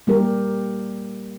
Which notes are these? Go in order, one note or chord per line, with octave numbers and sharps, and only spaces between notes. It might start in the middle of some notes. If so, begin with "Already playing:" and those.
G3 A#3 G4 A#4